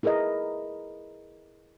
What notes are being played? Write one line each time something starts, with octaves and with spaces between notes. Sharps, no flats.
E4 G#4 A#4 B4 D#5